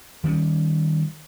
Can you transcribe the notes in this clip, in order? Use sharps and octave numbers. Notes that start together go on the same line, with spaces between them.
D#3 G3 B3 C#4